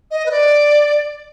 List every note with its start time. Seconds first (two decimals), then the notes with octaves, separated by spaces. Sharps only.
0.11 D#5
0.26 B4
0.31 D5